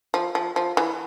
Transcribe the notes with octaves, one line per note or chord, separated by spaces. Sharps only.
F3
F3
F3
E3